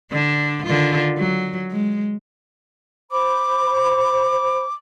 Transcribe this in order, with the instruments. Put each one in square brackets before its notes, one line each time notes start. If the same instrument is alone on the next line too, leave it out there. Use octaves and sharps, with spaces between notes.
[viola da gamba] D3 D4
D3 D#3 F4
F#3
G#3
[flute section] C5 B5 [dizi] D6